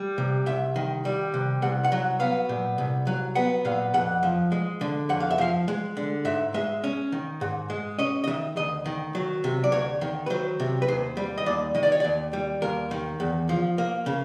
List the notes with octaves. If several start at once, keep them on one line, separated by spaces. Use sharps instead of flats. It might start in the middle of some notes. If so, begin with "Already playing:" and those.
Already playing: G3
C3
C2 E5
D#3
G3
C3
C2 F#5
F#5
F#3
B3 F5
A#2
C2
F#3
B3 F#5
A#2 F5
F2 F#5
F3
G#3
D3
F2 F#5
F5
E5
F3 F5
G#3
D3
G#2 E5
G#3 E5
C#4
D#3
G#2
G#3
C#4 D#5
D#5
D#3 E5
D2 D#5
D#3
F#3
C3
D5
D2 C#5
D#3
B4
F#3 C5
C3
B4
D#2 C5
G3
D#5
D#2 D5
D#3 D#5
D5
C#5
D#2 D5
G3
D#2 A#4
D#3
E2
F3
A#3
C#3